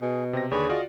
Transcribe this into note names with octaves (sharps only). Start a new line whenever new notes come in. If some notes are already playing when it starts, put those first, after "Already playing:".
B2 G#4
C3 C4 A#6
D#2 D3 G#4 B4 C#5 D5
F4 F#4 D5 D#5 F5